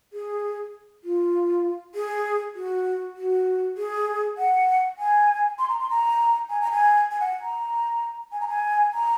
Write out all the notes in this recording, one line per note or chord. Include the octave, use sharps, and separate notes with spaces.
G#4
F4
G#4
F#4
F#4
G#4
F#5
G#5
C6
A#5
C6
A#5
G#5
A#5
G#5
G#5
F#5
A#5
G#5
A#5
G#5
A#5